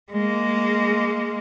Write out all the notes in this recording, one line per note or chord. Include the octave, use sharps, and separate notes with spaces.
G#3 A#3